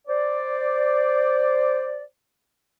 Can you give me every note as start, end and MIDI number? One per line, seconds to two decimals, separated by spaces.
0.08 2.02 72
0.08 2.02 74